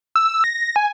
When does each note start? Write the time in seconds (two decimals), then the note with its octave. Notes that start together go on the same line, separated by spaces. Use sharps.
0.15 E6
0.44 A#6
0.76 G#5